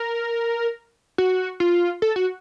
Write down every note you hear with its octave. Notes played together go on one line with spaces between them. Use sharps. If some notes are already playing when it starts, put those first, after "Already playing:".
Already playing: A#4
F#4
F4
A4
F#4